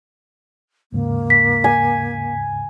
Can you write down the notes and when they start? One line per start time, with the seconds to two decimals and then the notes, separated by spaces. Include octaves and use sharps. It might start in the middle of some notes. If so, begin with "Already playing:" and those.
0.92 D#2 G#2 C#3 A#3
1.30 B6
1.64 G#5